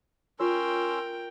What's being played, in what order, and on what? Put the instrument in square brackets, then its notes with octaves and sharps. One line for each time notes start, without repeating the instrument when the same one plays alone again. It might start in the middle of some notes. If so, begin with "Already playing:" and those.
[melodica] C#4 C6 E6 [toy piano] F4 C#5 [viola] A#4 G5